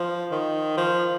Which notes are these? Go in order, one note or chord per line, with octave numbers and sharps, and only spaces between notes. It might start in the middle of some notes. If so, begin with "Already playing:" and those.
Already playing: F3
D#3
F3